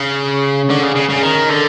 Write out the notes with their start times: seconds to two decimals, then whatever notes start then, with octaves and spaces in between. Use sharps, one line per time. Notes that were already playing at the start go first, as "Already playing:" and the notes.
Already playing: C#3
0.70 D3
0.83 C#3
0.95 C#3
1.09 C#3
1.22 D#3
1.49 D3